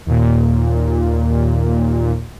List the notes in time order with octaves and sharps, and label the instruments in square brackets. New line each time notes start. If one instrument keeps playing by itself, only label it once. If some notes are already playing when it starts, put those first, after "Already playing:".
[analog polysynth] D#2 A#2